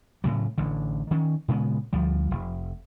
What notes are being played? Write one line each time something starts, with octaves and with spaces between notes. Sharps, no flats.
A2 C#3 F#3
A1 D3
D#3 C#4
A#2 C#3 G#3 B3
D2 F3 G3
F1